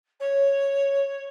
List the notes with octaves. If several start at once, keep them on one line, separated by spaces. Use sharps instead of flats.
C#5